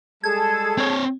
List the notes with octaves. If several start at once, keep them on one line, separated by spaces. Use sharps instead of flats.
G3 G#3 G#4 A4 A5 G#6
C4 C#5